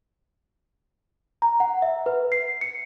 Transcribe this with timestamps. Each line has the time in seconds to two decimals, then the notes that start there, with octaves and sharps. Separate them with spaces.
1.42 A#5
1.60 F#5
1.82 E5
2.06 B4
2.32 C7
2.61 C#7